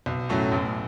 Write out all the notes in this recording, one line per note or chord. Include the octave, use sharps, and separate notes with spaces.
B1
A2 F#3 A3 C#4
A1